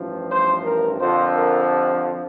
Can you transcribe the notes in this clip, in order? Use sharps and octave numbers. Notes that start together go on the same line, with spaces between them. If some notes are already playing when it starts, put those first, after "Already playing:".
Already playing: A1 G2 F3
C5
A#4
F2 D3 F3 C5
A#4
G4